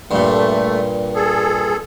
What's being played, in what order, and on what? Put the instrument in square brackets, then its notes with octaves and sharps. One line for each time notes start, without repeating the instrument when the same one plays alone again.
[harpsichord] G2 A#2 [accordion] A3
[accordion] G#4 A4